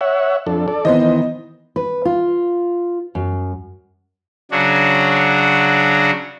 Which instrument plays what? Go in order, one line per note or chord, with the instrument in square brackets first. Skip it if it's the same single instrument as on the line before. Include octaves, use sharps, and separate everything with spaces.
[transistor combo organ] C#5 E5 F#5
F2 D4 A4
A4 D5
[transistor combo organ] D#3 E3 [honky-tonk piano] B3 C5 D#5
[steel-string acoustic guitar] B4
F4
F#2
[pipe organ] C#3 F#3 D4 F#4